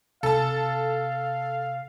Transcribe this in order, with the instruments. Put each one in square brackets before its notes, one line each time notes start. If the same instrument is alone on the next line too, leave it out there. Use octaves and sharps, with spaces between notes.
[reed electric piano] C3 [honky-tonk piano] A4 A5 [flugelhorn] F5